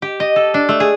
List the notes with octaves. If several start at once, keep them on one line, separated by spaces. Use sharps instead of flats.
G4
D#5
A4
D4
A3
G#4